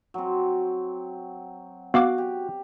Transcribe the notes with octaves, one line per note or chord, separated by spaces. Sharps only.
F#3 C4
B3 F#4 F5 D6
G4